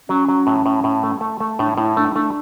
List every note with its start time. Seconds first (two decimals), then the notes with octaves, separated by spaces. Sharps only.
0.09 F#3 C#4
0.28 F#3
0.47 A2
0.66 A2
0.84 A2
1.03 A3
1.21 A3
1.40 A3
1.59 A2 D4
1.77 A2 E4
1.97 A3 D4
2.15 A3 D4